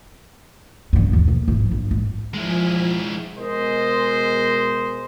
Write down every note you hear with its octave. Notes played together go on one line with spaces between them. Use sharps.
G2 C#3
D#2 B2
A#3
G#1 F3
G1
G#2
F3 G#3 E4 G#5 B6
B2 G#3 A#4 C5 D#5